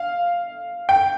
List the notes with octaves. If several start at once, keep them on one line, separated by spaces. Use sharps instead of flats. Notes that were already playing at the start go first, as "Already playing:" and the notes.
Already playing: F5
G5